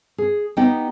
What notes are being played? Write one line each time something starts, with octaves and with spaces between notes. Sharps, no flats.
G#4
B3 D#4 G4 D#5 G5